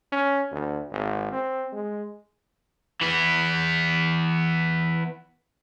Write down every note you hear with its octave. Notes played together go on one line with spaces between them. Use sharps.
C#4
D2
G#1
C4
G#3
E3 B3